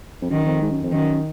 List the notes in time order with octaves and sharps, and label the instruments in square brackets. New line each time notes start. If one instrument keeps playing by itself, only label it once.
[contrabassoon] F2
[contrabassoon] F#2 [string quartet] D#3
[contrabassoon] F2
G#2
F#2
F2
[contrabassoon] F#2 [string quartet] D#3